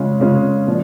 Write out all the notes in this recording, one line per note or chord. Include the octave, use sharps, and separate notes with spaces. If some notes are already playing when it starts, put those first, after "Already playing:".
Already playing: C#3 G#3 C#4 F4
C#3 G#3 C#4 F4
A#2 F3